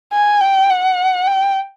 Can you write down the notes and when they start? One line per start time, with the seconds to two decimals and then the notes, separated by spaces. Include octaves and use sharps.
0.13 G#5
0.41 G5
0.70 F#5
1.28 G5